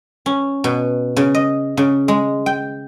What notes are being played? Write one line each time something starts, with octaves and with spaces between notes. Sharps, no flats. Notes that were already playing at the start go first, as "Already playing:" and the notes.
C#4
B2
C#3
D#5
C#3
G#3
G5